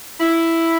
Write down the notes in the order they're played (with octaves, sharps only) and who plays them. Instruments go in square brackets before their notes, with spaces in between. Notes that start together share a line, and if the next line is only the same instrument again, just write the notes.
[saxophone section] E4